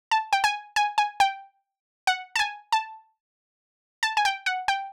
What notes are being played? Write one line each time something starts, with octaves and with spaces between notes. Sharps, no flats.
A5
G5
G#5
G#5
G#5
G5
F#5
A5
G#5
A5
A5
G#5
G5
F#5
G5